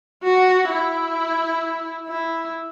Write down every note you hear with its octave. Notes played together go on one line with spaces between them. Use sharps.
F#4
E4
E4